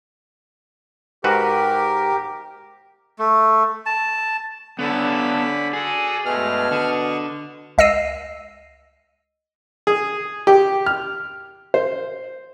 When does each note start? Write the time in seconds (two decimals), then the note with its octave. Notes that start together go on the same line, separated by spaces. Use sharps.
1.24 G#2 F#4 G4 A#4 B4
3.19 A3
3.86 A5
4.79 D3 B3 C#4 A4 D5 B5
5.73 F#4 G#4 A4 D5
6.26 G2 B2 G#3 A3 F6
6.71 D3 C#6 D#6
7.78 C#2 D#5 E6 C7 D#7
9.87 G#4
10.47 G4
10.86 F6
11.74 C5